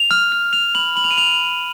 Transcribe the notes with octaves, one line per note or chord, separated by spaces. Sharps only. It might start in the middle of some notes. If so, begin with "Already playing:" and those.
Already playing: F7
F6
F6
F6 F7
B5 F#7
B5 F#7
F7
D#7
B5 F7